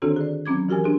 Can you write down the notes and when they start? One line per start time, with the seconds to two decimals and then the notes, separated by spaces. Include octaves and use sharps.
0.02 D3 D#3 C4 D4 F#4 A4
0.16 G#4 D5
0.46 F#3 C4 C#4 D6 G#6
0.69 E3 F#4 G4 A#4 G#5
0.84 D4 G#4